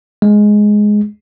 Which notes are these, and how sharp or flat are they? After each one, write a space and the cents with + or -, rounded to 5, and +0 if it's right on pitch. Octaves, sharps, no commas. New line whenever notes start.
G#3 +5